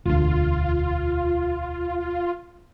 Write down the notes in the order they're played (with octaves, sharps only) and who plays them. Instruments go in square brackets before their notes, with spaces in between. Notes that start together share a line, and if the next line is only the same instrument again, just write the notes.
[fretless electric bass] E1 D2 [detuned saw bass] F4